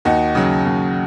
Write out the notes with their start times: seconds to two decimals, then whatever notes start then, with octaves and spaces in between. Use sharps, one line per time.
0.05 D#2 D#4 F#4
0.35 C#3 F#3
0.65 D#2